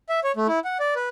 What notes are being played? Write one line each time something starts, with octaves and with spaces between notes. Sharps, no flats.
E5
C#5
A3
E4
F#5
D5
B4